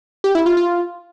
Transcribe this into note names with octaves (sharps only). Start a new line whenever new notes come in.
G4
E4
F4
F4